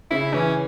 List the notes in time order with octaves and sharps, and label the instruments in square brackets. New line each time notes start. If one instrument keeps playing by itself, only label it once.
[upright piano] C#3 [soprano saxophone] E4
[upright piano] E3 [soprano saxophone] C#4